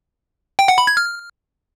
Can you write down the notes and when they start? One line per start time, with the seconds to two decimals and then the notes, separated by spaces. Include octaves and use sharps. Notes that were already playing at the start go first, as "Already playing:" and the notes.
0.59 G5
0.68 F#5
0.78 B5
0.87 G#6
0.97 F6